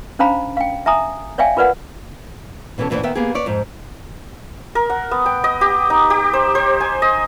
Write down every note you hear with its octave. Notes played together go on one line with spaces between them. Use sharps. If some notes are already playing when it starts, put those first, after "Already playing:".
C#4 D4 C5 F5 A#5 B5
F5 G5
E5 G#5 A#5 D#6
C#5 D5 E5 F5 G5 G#5
F4 A#4 B4 D5 F#5
B2 E3 B3 C#4 A4
F2 A2 E3 A3 B3 D4
D#2 D#3 B3 E5 G5
A#3 B3 G4 G#4
B4 C#5 D5
F2 G#2
A#4
F#5
B3
G5
D#5
G4
D#4
G4
C5
C5
G#5
D#5